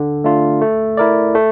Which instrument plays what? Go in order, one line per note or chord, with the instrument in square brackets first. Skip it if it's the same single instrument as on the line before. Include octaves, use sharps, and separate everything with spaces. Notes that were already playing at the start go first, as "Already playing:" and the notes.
Already playing: [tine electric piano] D3
A3 D4 F4
A3
E4 A#4 D5
A3